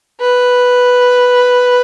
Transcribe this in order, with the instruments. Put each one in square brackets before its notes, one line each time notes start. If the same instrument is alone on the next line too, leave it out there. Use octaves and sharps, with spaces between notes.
[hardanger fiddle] B4